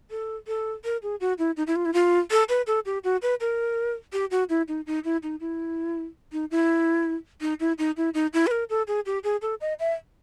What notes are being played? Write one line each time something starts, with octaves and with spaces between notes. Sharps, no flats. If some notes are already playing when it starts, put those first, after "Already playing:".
A4
A4
A#4
G#4
F#4
E4
D#4
E4
F4
E4
F4
A4
B4
A4
G4
F#4
B4
A#4
G4
F#4
E4
D#4
D#4
E4
D#4
E4
D#4
E4
D#4
E4
D#4
E4
D#4
E4
B4
A#4
A4
G#4
G4
G#4
A4
D#5
E5